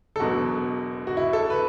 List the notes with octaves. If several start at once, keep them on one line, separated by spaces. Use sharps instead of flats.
A4
E1 E2 B2 F#3 F#4
F#4
E4
A4
B4